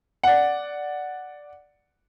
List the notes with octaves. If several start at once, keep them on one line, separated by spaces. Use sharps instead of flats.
D5 F#5